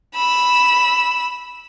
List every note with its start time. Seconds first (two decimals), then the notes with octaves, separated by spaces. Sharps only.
0.16 B5 E6